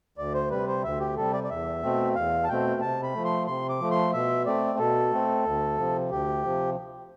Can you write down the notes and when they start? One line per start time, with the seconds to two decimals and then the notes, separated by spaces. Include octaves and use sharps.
0.18 D2 D5
0.34 C5
0.50 C3 G3 B4
0.67 C5
0.84 D2 E5
1.00 G4
1.16 C3 G3 A4
1.33 D5
1.44 D5
1.49 E2 E5
1.83 B2 A3 C4
2.15 E2 F5
2.44 A5
2.49 B2 A3 C4 G5
2.81 C3 A5
3.03 B5
3.14 F3 A3
3.25 C6
3.47 C3 C6
3.69 D6
3.80 F3 A3
3.91 C6
4.13 B2 E5
4.46 A3 C4 D5
4.79 B2 A4
5.12 A3 C4
5.45 D2
5.78 C3 F3
6.10 D2 G4
6.44 C3 F3